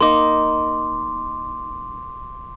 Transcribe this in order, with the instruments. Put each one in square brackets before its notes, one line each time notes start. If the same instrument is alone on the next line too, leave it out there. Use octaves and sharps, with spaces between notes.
[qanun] A#3 D#4 [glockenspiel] C6 D6